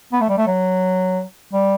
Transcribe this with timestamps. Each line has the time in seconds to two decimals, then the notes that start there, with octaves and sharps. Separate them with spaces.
0.12 B3
0.21 A3
0.29 G3
0.37 A3
0.47 F#3
1.53 G3